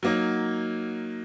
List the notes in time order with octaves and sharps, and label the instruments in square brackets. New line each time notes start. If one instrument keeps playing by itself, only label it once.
[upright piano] F#3 A#3 D#4